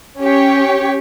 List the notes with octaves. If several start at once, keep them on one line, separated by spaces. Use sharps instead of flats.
C#4 G4 C#5